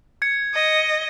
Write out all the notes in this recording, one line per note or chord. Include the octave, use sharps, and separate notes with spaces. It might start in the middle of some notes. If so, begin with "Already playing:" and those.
G#6 C#7
D#5